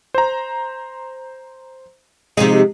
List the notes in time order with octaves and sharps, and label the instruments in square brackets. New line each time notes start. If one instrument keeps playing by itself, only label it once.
[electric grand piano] C5 A#5
[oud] C3 F3 D#4 [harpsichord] G#3